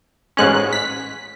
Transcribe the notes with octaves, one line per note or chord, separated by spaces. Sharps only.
A1 G#2 G#3 C#4 F#6
B6